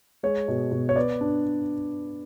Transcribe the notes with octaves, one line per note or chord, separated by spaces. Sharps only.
G#3 C#5
B2
B2
C#5
B3 D5
D4